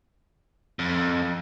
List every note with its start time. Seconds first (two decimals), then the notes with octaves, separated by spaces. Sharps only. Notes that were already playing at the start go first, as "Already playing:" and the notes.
0.79 F2